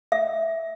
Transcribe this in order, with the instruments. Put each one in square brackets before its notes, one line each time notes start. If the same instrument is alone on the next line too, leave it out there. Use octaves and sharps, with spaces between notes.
[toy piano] E5